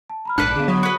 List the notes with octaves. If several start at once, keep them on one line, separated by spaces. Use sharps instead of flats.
A5
A#5 B5 F6
A#1 G#2 D4 B4 F#6 C#7
D3 B3 G#4 F5
F#3 B5 C#6 D#6
F#4 B4